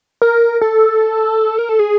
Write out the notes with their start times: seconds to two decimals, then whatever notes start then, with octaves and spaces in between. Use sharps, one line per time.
0.22 A#4
0.61 A4
1.59 A#4
1.69 A4
1.79 G#4